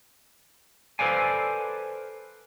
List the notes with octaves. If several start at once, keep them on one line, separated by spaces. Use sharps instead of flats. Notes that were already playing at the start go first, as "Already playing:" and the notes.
A4 B4 C5 D5 F5 G#5